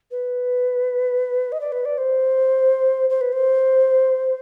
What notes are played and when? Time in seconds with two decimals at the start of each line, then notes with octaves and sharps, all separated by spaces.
0.11 B4
1.52 D#5
1.61 D5
1.72 B4
1.85 D5
1.98 C5
3.10 C5
3.21 B4
3.32 C5